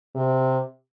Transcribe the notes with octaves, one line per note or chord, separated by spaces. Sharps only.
C3